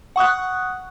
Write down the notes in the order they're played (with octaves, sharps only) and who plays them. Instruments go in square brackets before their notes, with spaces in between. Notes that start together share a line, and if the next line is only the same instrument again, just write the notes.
[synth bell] F#5 C#6 D#6 F#6